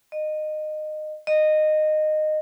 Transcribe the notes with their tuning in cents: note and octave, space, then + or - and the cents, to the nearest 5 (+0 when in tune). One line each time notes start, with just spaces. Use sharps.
D#5 -20
D#5 -15